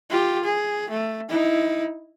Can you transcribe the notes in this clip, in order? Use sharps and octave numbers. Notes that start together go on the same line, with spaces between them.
F4 G4
G#4
A3
D#4 E4